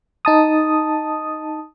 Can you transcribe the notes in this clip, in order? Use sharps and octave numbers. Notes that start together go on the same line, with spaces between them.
D#4 A5 D#6